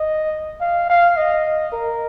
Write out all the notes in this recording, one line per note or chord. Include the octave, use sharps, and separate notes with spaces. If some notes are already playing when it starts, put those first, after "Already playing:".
Already playing: D#5
F5
F5
D#5
A#4